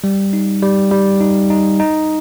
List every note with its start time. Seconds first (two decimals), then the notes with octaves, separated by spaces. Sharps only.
0.04 G3
0.33 D#4
0.62 G3
0.92 G3
1.20 D#4
1.50 D#4
1.80 D#4